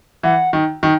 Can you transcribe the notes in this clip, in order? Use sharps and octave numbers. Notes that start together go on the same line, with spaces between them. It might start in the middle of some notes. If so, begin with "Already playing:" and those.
E3 F#5
D#3
D#3